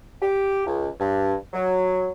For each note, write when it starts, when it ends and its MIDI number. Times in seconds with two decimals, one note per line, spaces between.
0.22 0.64 67
0.66 0.89 37
1.00 1.35 43
1.53 2.11 54